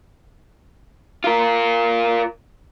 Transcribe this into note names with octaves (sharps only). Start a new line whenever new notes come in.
F4 A#4